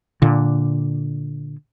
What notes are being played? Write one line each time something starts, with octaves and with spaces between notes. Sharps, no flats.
A#2 D3